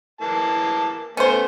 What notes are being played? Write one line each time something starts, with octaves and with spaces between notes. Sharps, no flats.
E3 A#3 A5
A3 B3 C#4 C5